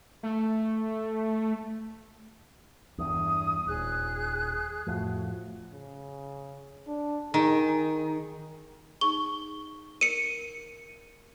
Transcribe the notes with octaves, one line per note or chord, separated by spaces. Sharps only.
A3
E2 G2 D#6
D#1 G#4 F#6
F2 A2 F3 F#4
C#3
D4
D#3 G#4
D#4 G#4 C#6 G7
A#4 C#7 D#7